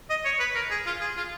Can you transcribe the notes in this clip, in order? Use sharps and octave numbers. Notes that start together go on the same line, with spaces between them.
D#5
C#5
B4
A#4
G#4
F4
G#4
F4